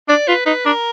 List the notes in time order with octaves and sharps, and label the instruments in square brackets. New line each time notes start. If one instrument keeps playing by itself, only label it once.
[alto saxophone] D4 [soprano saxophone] D5
[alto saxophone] F4 [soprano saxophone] B4
[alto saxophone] D#4 [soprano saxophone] B4
[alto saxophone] D4 [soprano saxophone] A#4